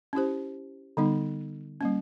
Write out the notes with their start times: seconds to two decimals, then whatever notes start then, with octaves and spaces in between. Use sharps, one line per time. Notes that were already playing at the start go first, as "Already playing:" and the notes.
0.13 C#4 E4 G4 C5
0.97 D3 G3 B3 D#4
1.81 G3 A#3 C#4